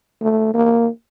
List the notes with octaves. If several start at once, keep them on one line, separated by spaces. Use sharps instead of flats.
A3
A#3